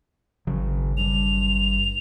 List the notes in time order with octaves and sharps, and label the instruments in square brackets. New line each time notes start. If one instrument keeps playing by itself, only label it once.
[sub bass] G#1 [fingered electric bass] C#3 F#3
[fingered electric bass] G2 [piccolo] F7